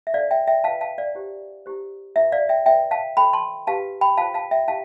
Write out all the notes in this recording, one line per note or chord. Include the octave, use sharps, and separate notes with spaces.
E5
D4 A4 C5 D5 F5
E5 G5
E5 G5
F4 B4 F5 A5
F5 A5
D5 F5
E4 G4 C5
E4 G4 C5
E4 B4 E5
D5 F5
E5 G5
E4 B4 E5 G5
F5 A5
F4 A4 C5 G5 B5
A5 C6
E4 G4 B4 F5 A5
G5 B5
F4 C5 F5 A5
F5 A5
E5 G5
E4 G4 F5 A5